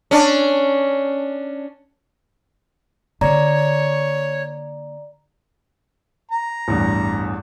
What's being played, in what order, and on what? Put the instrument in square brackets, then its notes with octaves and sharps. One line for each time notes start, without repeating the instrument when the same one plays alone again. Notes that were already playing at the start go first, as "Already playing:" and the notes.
[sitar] C#4 D4
[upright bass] D3 A#3 [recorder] C#5 [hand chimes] D5 A#5
[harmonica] A#5
[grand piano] A1 E2 G2